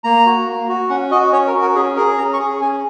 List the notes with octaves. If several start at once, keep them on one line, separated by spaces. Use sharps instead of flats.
A#3 A#5
F#4
A#3
F#4
C#4 F#5
F#4 D#5
C#4 C#5
A#4
F#4
A#4
C#4 G#4
G#4 A#4
C#4 A#5
C#6
G#4
C#4 G#5